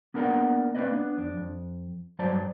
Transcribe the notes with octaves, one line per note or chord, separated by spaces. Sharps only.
A#3 B3 D4 A#4 D5 F#5
A#3 C4 C#4 B4 D5 D#5
B3 D4
F2 D4
F2
G2 F#3 C5 D5 A5